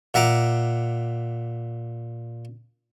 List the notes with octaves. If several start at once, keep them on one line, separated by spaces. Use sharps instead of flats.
A#2 E5 F#5 A#5 D6